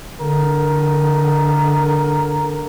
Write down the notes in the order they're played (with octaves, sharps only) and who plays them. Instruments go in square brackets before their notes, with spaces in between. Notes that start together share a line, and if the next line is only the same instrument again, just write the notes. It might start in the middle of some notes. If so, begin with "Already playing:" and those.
[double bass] D3 [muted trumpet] A#4